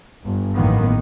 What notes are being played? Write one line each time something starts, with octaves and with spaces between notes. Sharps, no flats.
G1
A1 F#2 D#3 A#3 B3